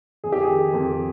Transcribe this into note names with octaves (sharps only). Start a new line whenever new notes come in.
F2 G#4
G4
G#4
D#3
F2